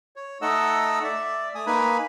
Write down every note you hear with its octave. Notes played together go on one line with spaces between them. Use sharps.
C#5
A3 D#4 A4 D#5 F#5 E6
D5 E5
A3 G#5 D#6
A#3 D#4 B4 G#5 B5